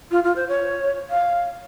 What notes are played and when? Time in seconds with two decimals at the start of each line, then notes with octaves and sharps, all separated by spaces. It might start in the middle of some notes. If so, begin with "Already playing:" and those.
0.11 F4
0.24 F4
0.36 C5
0.48 C#5
1.10 F5